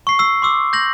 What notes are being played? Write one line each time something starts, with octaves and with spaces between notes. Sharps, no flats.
C#6 C7
E6 C7
C6 D6 E6
G6 A#6 F#7